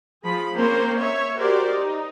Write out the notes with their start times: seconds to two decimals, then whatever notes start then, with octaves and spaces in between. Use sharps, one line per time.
0.23 F3 G#4 B5
0.54 A#3 C4 C#4 A#4 C5
0.98 C#5 E5
1.37 F#4 G4 A#4 C5 D5
1.70 D#4